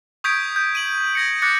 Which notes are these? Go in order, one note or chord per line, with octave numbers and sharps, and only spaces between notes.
C#6 D#6 G6 G#6 B6 D7
G6
D#7 F#7
G#6 A#6 C#7
D6 F#6 A6 A#6 C#7